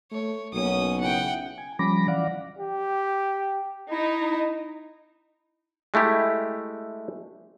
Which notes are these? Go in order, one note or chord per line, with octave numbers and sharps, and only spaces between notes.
A3 C#5
B1 F#3 A#3 C#4 D#6
C#3 C#4 E4 F#5 G5
G#5
F3 G3 C#4 B5 D6 A#6
E3 D5 F5 F#5 D6
G4
D#4 E4
G#3 A3 E4 G4